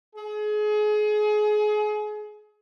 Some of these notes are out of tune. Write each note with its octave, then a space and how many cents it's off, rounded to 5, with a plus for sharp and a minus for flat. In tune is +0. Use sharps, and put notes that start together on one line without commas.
G#4 +30